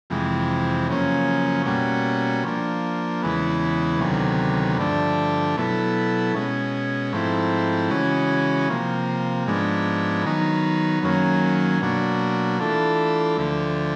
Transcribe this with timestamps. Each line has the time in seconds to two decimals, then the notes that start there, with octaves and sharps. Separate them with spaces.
0.10 F2 C3 E3 G#3
0.88 F#2 C#3 F3 A#3 C#4
1.66 B2 G3 A#3 C#4 F#4
2.44 F3 A#3 D4
3.22 E2 C#3 E3 G#3 B3
4.00 D2 C3 D#3 F#3 B3
4.78 G2 D3 F3 A3 D4
5.57 B2 F#3 B3 E4 A4
6.34 B2 G#3 C#4
7.13 G#2 F3 A3 C4 E4
7.91 C#3 E3 G#3 C#4 F#4
8.69 C3 F3 A#3
9.47 G#2 F3 G#3 B3 D4
10.25 D#3 F#3 B3 D#4
11.03 F#2 D#3 F#3 A#3 C#4
11.81 B2 F#3 A#3 D4 F#4
12.59 E3 A3 D4 F4 A4
13.38 D2 D3 F3 A3